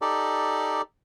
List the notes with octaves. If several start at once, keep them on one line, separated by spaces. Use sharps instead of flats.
D#4 G4 A4 D5